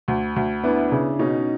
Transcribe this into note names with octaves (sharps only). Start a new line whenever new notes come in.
D2
D2
B3 D4 E4
C#3
B2 C#4 D#4